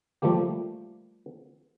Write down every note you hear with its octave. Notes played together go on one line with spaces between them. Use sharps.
F3 G3 A3 A#3 G4